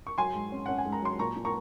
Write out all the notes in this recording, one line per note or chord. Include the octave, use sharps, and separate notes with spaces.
C#6
F#3 G#5 C6
G#2
C#4
C#4 F#5
G#5
G#2
A#5
F#3 C6
A#2 A#5 C#6
A#2
A#5 C#6